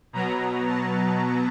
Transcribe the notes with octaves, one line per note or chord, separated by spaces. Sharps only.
B2 F#3 B3 A#5
A5